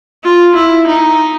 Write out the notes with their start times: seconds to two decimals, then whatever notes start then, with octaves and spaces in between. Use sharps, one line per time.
0.23 F4
0.55 E4
0.87 D#4